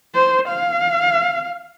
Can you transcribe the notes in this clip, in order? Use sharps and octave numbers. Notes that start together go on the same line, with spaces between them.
C5
F5